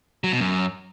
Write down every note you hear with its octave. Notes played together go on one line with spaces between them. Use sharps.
F#3
B2
F#2